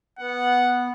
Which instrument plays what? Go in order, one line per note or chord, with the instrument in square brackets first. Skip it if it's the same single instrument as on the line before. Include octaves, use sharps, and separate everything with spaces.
[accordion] B3 [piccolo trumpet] F#5